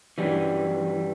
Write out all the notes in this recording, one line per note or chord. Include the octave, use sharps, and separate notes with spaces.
G2 E3 F#3 G3 C#4 G4